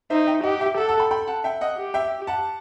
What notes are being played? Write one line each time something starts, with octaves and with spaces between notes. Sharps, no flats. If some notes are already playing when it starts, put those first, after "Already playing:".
D#4 C5 E5
E5 G5
G4 D#5 F#5
E5 G5
A4 F#5 A5
F#5 A5
G5 B5
G5 B5
F#5 A5
E5 G5
D#5 F#5
G4
E5 G5
F#5 A5